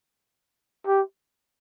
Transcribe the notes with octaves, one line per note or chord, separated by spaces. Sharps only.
G4